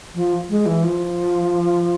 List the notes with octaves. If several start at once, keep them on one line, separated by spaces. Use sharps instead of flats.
F3
G#3
E3
F3